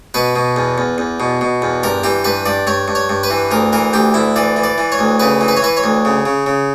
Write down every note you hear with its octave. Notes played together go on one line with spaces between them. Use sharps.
B2 B4
B2
E2
E2
E2
B2
B2
E2
G2 A#4
E3 G4
G2 B4
G2 D5
G2 C#5
G2
C#5
G2
B4
E3
D2 A#4
E3 A#4
D2 G4
D2 E4
E3 D5
E3
D5
E3
C#5
D2
C#3 B4
E3
B4
C#5
E3 B4
C#5
D2
C#3
C#3
C#3